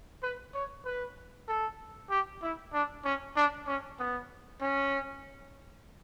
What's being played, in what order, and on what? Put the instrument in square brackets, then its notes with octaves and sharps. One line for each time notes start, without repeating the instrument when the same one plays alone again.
[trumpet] B4
C#5
B4
A4
G4
E4
D4
C#4
D4
C#4
B3
C#4